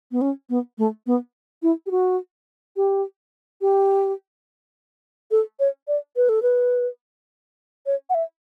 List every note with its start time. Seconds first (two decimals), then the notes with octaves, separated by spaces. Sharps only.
0.12 B3
0.21 C#4
0.50 B3
0.78 A3
1.07 B3
1.63 E4
1.86 G4
1.91 F#4
2.76 G4
3.61 G4
5.31 A4
5.60 C#5
5.88 D5
6.16 B4
6.29 A4
6.42 B4
7.86 C#5
8.10 F#5
8.14 E5